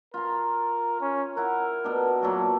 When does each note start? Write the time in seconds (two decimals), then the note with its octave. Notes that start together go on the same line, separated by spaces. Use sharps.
0.14 F4 A#4 A#5
1.01 C#4
1.37 E4 A#4 F#5
1.84 B2 D4
2.22 A#2 F#3 A4 A#4